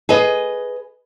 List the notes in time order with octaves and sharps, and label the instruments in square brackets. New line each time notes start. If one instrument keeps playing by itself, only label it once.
[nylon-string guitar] G#4 B4 D#5